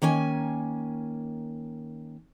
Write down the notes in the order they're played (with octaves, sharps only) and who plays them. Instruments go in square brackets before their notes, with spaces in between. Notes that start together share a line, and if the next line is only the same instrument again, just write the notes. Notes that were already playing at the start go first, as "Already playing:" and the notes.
[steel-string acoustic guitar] D#3 A#3 C#4 G#5